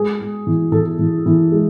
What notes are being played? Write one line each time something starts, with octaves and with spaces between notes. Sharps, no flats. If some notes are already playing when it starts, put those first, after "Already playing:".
Already playing: G#3 G#4
G#3
E3
E3 A4
E3
E3
G#3